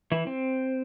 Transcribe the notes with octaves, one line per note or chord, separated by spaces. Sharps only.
E3 E4
C4